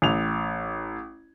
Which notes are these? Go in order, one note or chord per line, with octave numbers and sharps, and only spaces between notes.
A1 F7